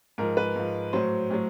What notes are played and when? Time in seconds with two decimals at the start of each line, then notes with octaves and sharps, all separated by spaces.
0.18 G#2 F3 A#4
0.37 B4
0.56 G#2 F3
0.93 A2 F#3 C5
1.30 A2 F#3